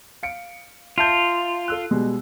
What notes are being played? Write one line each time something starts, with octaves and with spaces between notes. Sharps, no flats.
F5 C#7 D7
F4 E5 A5 G6
A4 E6 F#6
B2 G3 G#3